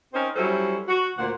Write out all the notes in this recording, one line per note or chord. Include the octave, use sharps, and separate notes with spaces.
C4 C#4 D#4 A#4 C5
F#3 G3 C#4 E4 A4 C5
F#4
D2 A#2 A#3 C5 F#5